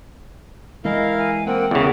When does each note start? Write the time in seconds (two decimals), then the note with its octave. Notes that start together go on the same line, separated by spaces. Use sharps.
0.85 E3 G#3 E4 A#4 D#5 F5
1.18 G#5
1.46 A#3 C4 F#5 G5
1.71 E2 C#3 A#4 F#5